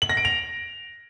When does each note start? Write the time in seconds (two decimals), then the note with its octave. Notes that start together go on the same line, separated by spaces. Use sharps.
0.02 F#7
0.09 A#6
0.17 D7
0.25 F7